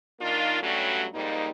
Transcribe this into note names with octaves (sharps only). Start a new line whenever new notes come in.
D#3 A#3 D4 D#4 F4
G2 F#3 G3 A3 C#4 F#4
F2 G#2 G3 A#3 D#4